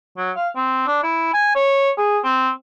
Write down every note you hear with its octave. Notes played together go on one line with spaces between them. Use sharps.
F#3
F5
C4
D4
E4
G#5
C#5
G#4
C4